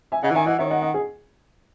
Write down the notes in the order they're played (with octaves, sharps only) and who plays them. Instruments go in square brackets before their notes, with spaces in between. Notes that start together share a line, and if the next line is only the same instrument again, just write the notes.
[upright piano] E5 G#5
[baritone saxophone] C#3 [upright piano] D#5 F#5
[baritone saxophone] E3
[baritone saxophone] D#3 [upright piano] E5 G#5
[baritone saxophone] E3 [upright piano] D#5 F#5
[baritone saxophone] D#3 [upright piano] C#5 E5
[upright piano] D#5 F#5
D#5 F#5
G#4